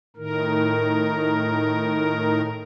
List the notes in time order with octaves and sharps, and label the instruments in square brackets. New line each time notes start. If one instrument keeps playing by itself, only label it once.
[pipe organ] A2 D#3 A#4